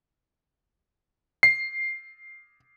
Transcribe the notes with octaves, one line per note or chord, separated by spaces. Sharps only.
C7